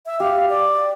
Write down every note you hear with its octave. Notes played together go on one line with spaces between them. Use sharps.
E5
G4 F5
D5